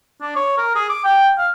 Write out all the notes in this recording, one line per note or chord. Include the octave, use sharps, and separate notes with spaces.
D4
C#5
A#4
G#4
D6
G5
F5